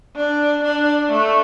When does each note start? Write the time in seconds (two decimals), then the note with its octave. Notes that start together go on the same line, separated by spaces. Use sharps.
0.15 D4
0.63 D4
1.11 A3